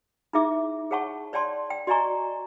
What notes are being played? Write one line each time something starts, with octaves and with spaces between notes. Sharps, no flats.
D#4 E4 G#4 E5 D6
G#4 C#5 F#5 A5 C#6
C#5 D5 G5 A5 C6
G5
F#4 D5 D#5 G#5 A#5 C#6